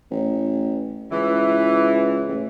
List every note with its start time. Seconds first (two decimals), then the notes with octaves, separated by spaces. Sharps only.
0.11 A1
1.11 C#2 E3
2.28 A1